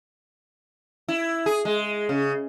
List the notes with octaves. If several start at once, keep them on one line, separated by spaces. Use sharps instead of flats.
E4
G#4
G#3
C#3